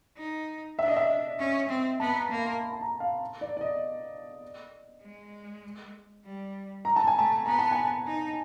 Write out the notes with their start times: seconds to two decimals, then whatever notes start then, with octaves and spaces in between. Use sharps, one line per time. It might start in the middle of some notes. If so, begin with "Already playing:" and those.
0.17 D#4
0.79 D4 E5
0.88 D#5
0.97 E5
1.39 C#4
1.69 C4
2.00 B3 A5
2.15 A#5
2.30 A#3 B5
2.46 C6
2.60 B5
2.73 A5
2.81 A#5
3.00 F5
3.41 D5
3.57 D5
3.61 D#5
5.03 G#3
6.25 G3
6.85 G#3 A#5
6.96 A5
7.07 G#5
7.16 A3 A5
7.46 B3 A#5
7.59 A5
7.71 G#5
7.84 A5
8.07 D#4